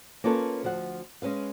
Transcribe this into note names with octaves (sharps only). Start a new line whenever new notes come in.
A#3 C#4 F4 A4 B4 C#5
D2 F3 F#5
G#3 C#4 B4 F5